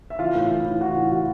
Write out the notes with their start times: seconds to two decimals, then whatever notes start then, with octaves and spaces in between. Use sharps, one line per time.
0.10 E5
0.19 E3 F4 F5
0.35 A2
0.51 E3
0.66 A2
0.81 E3 F#4 F#5
0.97 A2
1.12 E3 F#4 F#5